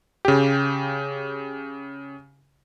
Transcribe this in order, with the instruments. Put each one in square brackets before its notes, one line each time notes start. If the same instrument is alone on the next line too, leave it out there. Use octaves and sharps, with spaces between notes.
[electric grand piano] C#3 G4